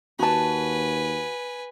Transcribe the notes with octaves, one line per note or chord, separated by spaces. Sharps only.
D#2 F#4 B4 G#5 A5